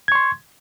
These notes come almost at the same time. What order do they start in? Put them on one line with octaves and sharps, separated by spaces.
G#6 C#6 C6